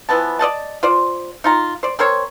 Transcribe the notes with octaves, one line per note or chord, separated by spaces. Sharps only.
E3 F3 B3 A5
D5 D#5 F#5 A5
F4 C5 D5
D#4 F4 A#5
C5 D5
C4 A#4 C5 C#5